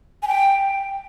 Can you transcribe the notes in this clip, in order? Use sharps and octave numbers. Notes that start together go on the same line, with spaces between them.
G#5
G5